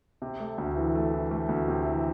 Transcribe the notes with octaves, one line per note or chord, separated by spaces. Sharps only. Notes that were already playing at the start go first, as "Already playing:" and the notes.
C3
A3
D2
E3
A3
E3
A3
D2
C3
E3